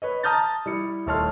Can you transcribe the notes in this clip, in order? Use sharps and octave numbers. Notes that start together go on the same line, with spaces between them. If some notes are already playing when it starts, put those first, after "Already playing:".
B4 C#5 D#5
A5 A#5 D#6 F6 G6 A6
G3 E4 C#7
D#1 A3 C#5 A5 C6 F6